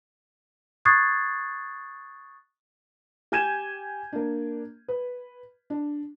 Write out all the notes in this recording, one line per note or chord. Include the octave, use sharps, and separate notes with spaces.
C#6 D#6 F#6 G#6 A6 C7
G4 G#5 G6 G#6 D#7 E7
A#3 D4
B4
D4